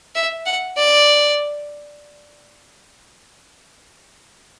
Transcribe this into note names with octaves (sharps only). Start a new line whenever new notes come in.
E5
F#5
D5